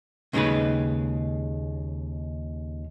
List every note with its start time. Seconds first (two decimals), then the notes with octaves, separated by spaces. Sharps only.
0.33 D#2 C#3 G#3 D#4 G#4 B4